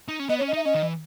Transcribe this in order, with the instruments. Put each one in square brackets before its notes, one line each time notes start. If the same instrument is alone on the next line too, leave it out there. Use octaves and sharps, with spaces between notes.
[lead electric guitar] D#4
C#4
[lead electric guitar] B3 [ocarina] D#5
[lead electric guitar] C#4 [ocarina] C#5
[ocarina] D#5
[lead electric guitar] D#4 [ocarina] E5
[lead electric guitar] C#4 [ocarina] D#5
[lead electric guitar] D#3
E3